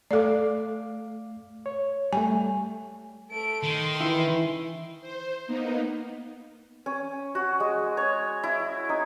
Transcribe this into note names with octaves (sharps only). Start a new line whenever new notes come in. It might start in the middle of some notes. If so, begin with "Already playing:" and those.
A3 A4 D5 F5 D6
C#5
G3 A3 G#5
A3 D7
D#3 C6
E3 E4
C5
A#3 B3 D#4
C#4
F#4
G#3
C#5
E4
D#4